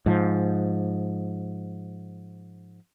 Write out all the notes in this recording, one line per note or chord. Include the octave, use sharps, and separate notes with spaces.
G#2 F3